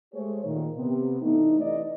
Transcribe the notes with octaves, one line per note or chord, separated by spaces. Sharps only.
G#3 A3 G4 G#4 C5 C#5
A#2 D#3
C3 B3
E3 A3 D4 D#4
C3 E3 D5 D#5